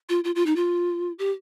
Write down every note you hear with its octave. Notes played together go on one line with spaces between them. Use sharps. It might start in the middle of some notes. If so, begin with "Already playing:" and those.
F4
F4
F4
D#4
F4
G4